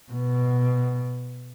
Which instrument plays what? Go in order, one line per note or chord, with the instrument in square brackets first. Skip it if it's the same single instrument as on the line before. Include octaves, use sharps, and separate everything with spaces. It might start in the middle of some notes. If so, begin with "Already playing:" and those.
[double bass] B2